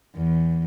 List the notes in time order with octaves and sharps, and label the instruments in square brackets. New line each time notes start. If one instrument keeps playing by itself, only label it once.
[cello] E2